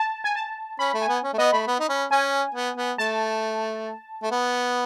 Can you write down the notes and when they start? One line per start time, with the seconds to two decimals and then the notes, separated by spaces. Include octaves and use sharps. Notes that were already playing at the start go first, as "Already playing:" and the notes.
Already playing: A5
0.24 G#5
0.35 A5
0.79 C#4 B5
0.94 A3
1.02 G#5
1.08 B3
1.24 C#4
1.33 A3
1.38 B3 D#5
1.52 A3 B5
1.67 B3
1.79 D#4
1.89 C#4
2.11 C#4 G#5
2.54 B3
2.77 B3
2.98 A3 A5
4.22 A3
4.31 B3